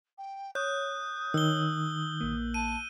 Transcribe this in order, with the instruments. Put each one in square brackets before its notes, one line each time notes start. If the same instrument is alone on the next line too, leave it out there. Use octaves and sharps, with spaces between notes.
[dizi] G5
[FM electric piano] C#5 [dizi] D#6 [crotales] F#6 G6
[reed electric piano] D#3 [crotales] E6 G7
[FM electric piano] A#1 A#3
[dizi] A5 [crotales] D#7